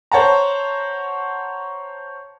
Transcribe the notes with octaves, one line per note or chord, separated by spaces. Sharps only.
C5 C#5 F#5 A5 A#5